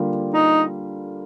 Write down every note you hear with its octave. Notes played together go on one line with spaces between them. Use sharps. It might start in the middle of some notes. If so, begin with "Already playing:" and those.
Already playing: D3 G3 A#3 F4
D#4